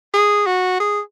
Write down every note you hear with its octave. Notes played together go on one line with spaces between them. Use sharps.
G#4
F#4
G#4